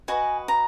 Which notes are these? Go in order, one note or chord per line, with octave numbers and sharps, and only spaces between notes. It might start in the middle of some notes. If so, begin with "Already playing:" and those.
F#4 B4 D#5 G#5
A#5